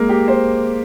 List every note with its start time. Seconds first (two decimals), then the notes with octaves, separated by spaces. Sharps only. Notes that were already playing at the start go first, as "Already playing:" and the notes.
Already playing: G#3 A#3
0.09 G4
0.28 C5